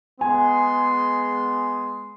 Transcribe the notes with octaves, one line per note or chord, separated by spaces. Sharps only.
G#3 B3 G#5 C6